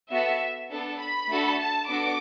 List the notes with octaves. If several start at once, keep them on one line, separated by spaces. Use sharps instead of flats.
B3 F#4 A4 E5
B3 D4 A4
B5
A3 D4 F#4 A4
A5
B3 D4 F#4 A4 D6